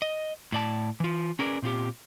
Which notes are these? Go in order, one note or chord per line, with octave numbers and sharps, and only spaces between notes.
D#5
A2 D5 A5
E3 F4
C#4 G#4 A#4 B4 D5
A#2 C4 F4 G4